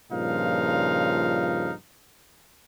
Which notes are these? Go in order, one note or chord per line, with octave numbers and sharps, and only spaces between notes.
G2 A#2 C#3 F3 D#4 F5